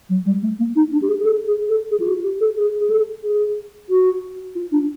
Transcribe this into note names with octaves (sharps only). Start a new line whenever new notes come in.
F#3
G3
A3
A#3
D#4
D4
G4
G#4
G#4
A4
G#4
A4
G#4
F4
F#4
G4
A4
G#4
G#4
A4
G#4
F#4
F4
D4